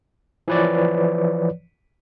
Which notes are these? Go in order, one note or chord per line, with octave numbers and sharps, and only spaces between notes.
E3 F3 B4 C#5 D5